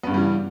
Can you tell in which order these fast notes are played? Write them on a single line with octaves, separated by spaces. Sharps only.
B3 G2 C#3 G3 E3